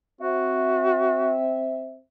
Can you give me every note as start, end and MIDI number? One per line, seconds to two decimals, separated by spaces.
0.21 1.99 60
0.21 1.35 66
0.21 1.99 76